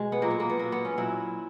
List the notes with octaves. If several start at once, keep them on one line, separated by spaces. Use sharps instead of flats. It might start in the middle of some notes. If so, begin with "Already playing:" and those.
Already playing: B2 G#3
B3
A#2 F#3 A#3
B3
A#3
B3
A#2 F#3 A#3
B3
C#4
A#2 F#3 E4